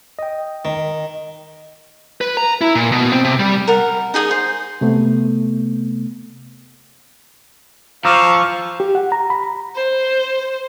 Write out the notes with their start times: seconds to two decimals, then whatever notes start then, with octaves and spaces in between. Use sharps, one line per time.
0.19 D#5 G5
0.65 D#3
2.21 B4
2.37 A#5
2.61 E4
2.75 A#2
2.92 B2
3.12 C4
3.25 C3
3.40 G3
3.68 A#4 F#5
4.14 D#4 G#4 G#5 D#6
4.31 C5
4.81 C3 A3 B3
8.05 F3 F5 A#5 C#6 D6 E6
8.80 G4
8.95 F#5
9.12 A#5
9.30 B5
9.76 C5